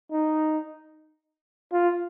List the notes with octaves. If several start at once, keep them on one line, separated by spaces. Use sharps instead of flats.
D#4
F4